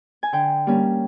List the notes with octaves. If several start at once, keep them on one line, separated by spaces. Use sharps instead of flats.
G#5
D3 G5
G3 A#3 C#4